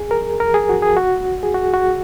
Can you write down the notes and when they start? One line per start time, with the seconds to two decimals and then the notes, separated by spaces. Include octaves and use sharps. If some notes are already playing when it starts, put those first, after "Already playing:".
Already playing: G#4
0.11 A#4
0.40 A#4
0.54 G#4
0.69 F#4
0.82 G#4
0.97 F#4
1.43 G#4
1.54 F#4
1.74 F#4